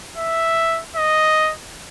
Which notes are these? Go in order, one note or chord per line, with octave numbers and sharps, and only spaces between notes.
E5
D#5